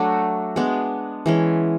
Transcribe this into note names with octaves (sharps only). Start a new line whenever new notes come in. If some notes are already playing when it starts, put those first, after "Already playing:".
Already playing: F#3 A3 D4 F#4
G#3 B3 D4
E3 G#3 C#4